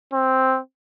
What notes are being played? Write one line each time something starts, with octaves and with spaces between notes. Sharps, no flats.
C4